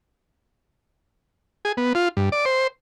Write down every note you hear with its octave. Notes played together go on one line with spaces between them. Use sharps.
G#4
B3
F4
G2
D5
C5